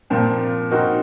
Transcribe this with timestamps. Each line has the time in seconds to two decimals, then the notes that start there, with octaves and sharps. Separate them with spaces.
0.10 A#2 F3 C4
0.70 C4 D#4 F#4 A#4